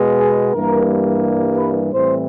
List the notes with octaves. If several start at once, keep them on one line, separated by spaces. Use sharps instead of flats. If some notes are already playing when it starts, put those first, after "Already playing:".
Already playing: B2 G#3 B3
G#4
G2 E3 G3 A#3 A#4
B4
A2 E3 G3 C4 C5